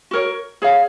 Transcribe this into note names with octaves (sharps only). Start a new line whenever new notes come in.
F#4 A#4 C#5
G#4 C#5 F5